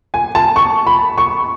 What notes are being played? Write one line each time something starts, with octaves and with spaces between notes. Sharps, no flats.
G#5
A5
C#6
B5
C#6